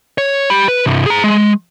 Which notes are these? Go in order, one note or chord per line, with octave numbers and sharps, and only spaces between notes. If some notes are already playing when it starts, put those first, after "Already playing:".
C#5
G4 B5
B4
C2 G2
G#4 A#5
G#3